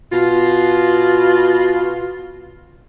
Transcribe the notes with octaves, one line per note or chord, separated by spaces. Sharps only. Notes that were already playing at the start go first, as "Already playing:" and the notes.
B2 F4